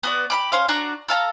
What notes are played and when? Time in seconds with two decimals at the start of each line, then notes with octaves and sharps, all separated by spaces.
0.03 B3 F#4 D5
0.30 G4 B5 D6
0.52 C#4 C5 F5
0.68 D4 F#4 D5 A#5
1.08 A4 F5 A5 A#5